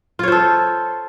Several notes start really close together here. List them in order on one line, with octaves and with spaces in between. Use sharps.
F4 C#5 C5 A4